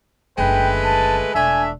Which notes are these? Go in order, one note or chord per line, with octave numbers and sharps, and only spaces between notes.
F#1 D3 G#3 A3 B4 G5
A5
E1 A3 D4 E5 G#5